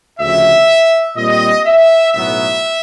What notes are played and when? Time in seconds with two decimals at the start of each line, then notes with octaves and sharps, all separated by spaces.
0.20 D2 C#3 F3 E5
1.17 A#2 G3 C4 D#5
1.65 E5
2.14 B1 A2 F#3 B3 E5